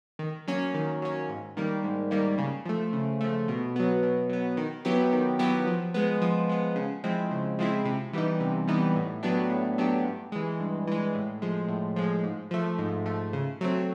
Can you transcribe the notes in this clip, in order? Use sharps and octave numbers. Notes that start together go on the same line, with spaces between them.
D#3
F#3 A#3 C#4
D#3
F#3 A#3 C#4
G#2
D#3 G3 A#3
G#2
D#3 G3 A#3
C#3
F3 A3
C#3
F3 A3
B2
F#3 B3
B2
F#3 B3
D#3
F#3 B3 E4 G4
D#3
F#3 B3 E4 G4
F3
G#3 B3
F3
G#3 B3
C#3
F3 G#3 C4 E4
C#3
F3 G#3 C4 E4
C3
E3 G3 B3 D#4
C3
E3 G3 B3 D#4
A2
F#3 B3 D4 G4
A2
F#3 B3 D4 G4
G2
E3 G#3
G2
E3 G#3
A2
F3 G#3
A2
F3 G#3
G#2
F3 A3
G#2
F3 A3
C#3
F#3 A3 C4